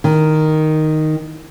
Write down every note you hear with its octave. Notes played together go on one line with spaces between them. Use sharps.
D#3